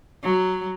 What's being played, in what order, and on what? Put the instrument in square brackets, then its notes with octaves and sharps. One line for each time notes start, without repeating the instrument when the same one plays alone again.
[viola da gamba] F#3